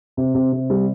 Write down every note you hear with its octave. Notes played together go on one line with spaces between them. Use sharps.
C3
C3
C3
G3